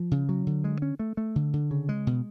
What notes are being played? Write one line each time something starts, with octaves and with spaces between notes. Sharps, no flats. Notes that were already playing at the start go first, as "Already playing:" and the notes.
Already playing: F3
C#3
F#3
D3
G#3
C#4
A3
A3
D3
D3
C#3
G#3
B2